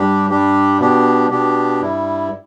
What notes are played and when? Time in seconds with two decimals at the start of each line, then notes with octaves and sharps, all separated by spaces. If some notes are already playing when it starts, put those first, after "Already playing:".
Already playing: G2 G3 D4 G4
0.30 G2 G3 D4 G4
0.80 B2 B3 D4 G4
1.31 B2 B3 D4 G4
1.81 G2 G3 E4